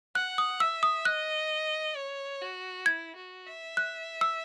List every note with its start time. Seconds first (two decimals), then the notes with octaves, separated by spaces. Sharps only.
0.15 F#5 F#6
0.38 D#6
0.60 E5 E6
0.83 D#6
1.05 D#5 F#6
1.96 C#5
2.42 F#4
2.86 E4 G#6
3.16 F#4
3.47 E5
3.77 F#6
4.21 E6